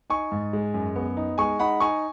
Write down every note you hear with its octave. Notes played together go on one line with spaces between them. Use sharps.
D#4 G#5 C#6
G#2
G#3
F#2
B3
D#4
G#3 G#5 C#6
D#4 F#5 B5
D#4 G#5 C#6